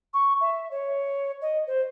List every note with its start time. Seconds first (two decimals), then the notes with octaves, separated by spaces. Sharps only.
0.13 C#6
0.40 E5
0.71 C#5
1.41 D#5
1.67 C5